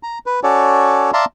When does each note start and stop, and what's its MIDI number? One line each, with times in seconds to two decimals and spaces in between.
0.03 0.19 82
0.26 0.40 71
0.43 1.11 61
0.43 1.11 66
0.43 1.11 69
0.43 1.11 73
0.43 1.11 74
1.13 1.25 74
1.13 1.25 76
1.13 1.25 77
1.13 1.25 81
1.13 1.25 82
1.13 1.25 84